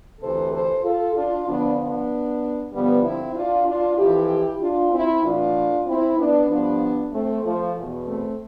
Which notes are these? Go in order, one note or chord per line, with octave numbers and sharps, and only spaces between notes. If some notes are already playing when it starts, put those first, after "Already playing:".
D2 C3 E3 A4 C5
A4 C5
F4 A4
D4 F4
F2 D3 F3 B3 D4
B3 D4
G2 D3 F3 G3 B3
C4 E4
D4 F4
D4 F4
F2 E3 E4 G4
D4 F4
C4 E4
A2 E3 D4 F4
C4 E4
B3 D4
G2 F3 B3 D4
A3 C4
F3 A3
E2 B2
A3 C4